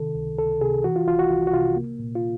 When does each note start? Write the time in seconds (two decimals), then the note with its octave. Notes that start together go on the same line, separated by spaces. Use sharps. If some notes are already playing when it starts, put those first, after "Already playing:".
Already playing: C3 D#3 A4
0.15 C#2
0.38 C#2 A4
0.61 C3 G#4
0.84 E3 F#4
0.96 F4
1.07 C2 F4
1.19 F#4
1.30 C2 F4
1.47 F#4
1.53 C3 F4
1.76 A#3
1.99 A#2
2.15 F4